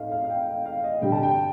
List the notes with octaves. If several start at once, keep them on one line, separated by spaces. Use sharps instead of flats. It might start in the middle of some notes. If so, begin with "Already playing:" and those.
Already playing: A2 A3 D#4 D#5 F5
F5
F5
G5
F5
F5
D#5
G2 D3 G3 G5
A5
G5